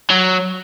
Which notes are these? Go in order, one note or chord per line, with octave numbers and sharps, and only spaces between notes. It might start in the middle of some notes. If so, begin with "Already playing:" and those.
F#3